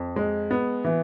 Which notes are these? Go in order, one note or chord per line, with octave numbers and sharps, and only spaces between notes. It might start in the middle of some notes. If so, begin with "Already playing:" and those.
Already playing: F2
G#3
B3
E3